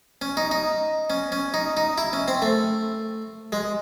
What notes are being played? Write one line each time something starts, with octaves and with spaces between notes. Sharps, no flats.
C#4
D#4
D#4
C#4
C#4
D#4
D#4
E4
C#4
C4
A3
G#3